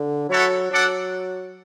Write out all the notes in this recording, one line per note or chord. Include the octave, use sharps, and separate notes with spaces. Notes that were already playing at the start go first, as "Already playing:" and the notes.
Already playing: D3
F#3 E4 A4 C#5 F#5
F#3 D4 A4 D5 F#5